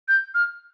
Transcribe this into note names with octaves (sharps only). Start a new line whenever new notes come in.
G6
F6